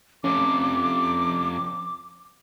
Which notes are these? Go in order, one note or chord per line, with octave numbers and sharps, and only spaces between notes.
F2 C3 C#4 D6